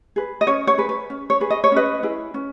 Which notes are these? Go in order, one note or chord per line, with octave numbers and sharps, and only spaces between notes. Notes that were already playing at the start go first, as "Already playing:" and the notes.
G#4 B4
D#5
C#4 C#5
C#5
G#4 B4
B4
C#4
C#5
G#4 B4
D#5
C#5
C#4 B4 D#5
E4 G#4 B4
C#4